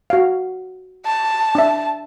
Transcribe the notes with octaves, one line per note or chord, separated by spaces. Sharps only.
F#4 F5
A5
D4 E5